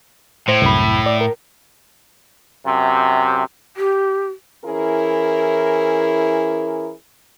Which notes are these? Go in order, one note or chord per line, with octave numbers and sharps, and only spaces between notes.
A2 C5
C2 F#2 B5
D5
A#4
F#2 C3
G4
E3 C#4 E4 G#4 A#4